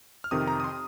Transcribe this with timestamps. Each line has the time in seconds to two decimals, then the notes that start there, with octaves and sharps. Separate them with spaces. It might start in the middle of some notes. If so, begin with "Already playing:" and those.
0.24 F6
0.31 F2 C3 D#3 D#6
0.47 A#5
0.60 D#6
0.64 C6